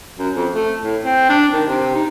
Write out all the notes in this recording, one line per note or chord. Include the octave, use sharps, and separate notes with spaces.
F#2
F2
A3
A2
C4
D4
D#3
C3
D#4